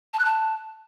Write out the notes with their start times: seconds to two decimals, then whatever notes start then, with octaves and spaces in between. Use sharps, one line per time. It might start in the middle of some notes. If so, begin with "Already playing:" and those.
0.14 A5
0.19 F#6
0.25 A5